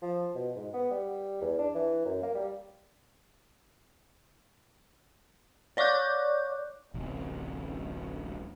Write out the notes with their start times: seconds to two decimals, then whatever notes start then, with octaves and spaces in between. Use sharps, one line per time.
0.02 F3
0.35 B2
0.56 G#2
0.74 B3
0.91 G3
1.41 E2
1.59 D4
1.75 E3
2.05 F#2
2.22 A#3
2.35 G3
5.77 C#5 D5 C#6 D6 F#6 G6
6.94 D1 A1 C3